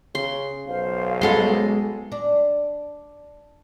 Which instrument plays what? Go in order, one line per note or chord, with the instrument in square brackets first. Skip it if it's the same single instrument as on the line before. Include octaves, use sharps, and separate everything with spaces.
[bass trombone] C#3 [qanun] C6
[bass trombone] B1 [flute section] C5 F5
[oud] G#3 B3 C#4 [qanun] A4 C6
[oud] D4